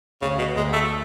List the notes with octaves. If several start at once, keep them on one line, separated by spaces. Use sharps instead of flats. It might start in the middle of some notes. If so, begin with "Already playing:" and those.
D2 C#3
B2
D2 G#3
A3